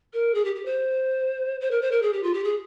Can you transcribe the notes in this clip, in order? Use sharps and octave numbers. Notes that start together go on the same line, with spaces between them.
A#4
G#4
G4
G4
C5
C5
A#4
C5
A#4
G#4
G4
F4
G4
G#4